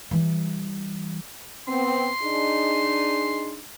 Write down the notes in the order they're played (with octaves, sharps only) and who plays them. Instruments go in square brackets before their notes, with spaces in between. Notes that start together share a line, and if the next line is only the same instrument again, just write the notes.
[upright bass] E3 G3
[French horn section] B3 C4 [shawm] C6
[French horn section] D4 D#4 G#4